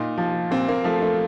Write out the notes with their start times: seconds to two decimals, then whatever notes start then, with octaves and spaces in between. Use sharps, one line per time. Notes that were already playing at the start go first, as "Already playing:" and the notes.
Already playing: A#2 D#4
0.18 F3
0.51 A#2 C4
0.69 A#3
0.84 F3 A3
1.02 A3